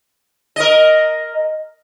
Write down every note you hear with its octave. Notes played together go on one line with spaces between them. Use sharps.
A#4 D#5